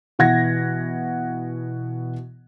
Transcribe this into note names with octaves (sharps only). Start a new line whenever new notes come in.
B2 E3 F#5 G#6 A#6